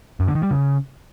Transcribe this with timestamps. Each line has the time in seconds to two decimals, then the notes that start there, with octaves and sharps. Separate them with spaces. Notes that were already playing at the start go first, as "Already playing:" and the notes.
0.20 F#2
0.28 D3
0.35 D#3
0.43 G3
0.51 C#3